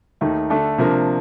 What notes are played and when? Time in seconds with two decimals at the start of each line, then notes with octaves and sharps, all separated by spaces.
0.21 D#2 D#3 A3 D#4
0.50 D3 A3 D4 A4
0.78 C3 F3 A#3 D4